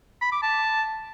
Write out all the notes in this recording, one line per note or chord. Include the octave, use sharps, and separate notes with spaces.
B5
D6
A5